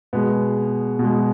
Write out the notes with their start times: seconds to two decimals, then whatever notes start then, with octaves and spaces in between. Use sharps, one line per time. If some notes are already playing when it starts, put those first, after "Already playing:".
0.13 B2 G#3 B3
0.99 B2 G#3